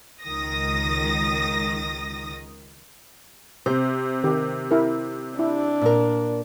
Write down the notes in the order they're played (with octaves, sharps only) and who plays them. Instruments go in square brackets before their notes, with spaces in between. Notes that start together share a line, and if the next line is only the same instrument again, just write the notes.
[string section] C#2 D#3 D#6 A#6
[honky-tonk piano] C3 [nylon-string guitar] C5
[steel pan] D#3 G4
E4 A#4
[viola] D4 [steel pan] E4
[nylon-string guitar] A#2 A#4